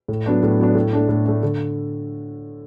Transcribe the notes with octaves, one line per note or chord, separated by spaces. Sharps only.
A2
F#3 B3 D4
A2
F#3 B3 D4
A2
A3 D4
A2
A3 D4
D3